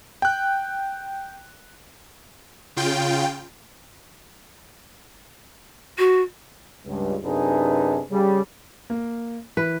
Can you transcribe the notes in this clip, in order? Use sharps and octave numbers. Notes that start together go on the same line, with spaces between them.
G5 F#6
C#3 F4 G5
F#4
C#2 G2
F#2 C3 D4 D#4 G#4 B4
C#3 G3
A#3
E3 B4